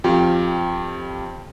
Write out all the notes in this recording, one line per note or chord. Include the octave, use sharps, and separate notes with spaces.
F2 F4 G4 G5